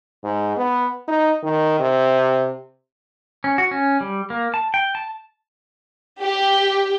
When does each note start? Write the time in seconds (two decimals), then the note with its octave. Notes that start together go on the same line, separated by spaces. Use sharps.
0.24 G#2
0.57 B3
1.08 D#4
1.43 D#3
1.79 C3
3.44 C#4
3.58 F#4
3.71 C#4
4.01 G3
4.30 A#3
4.54 A5
4.74 G5
4.95 A5
6.22 G4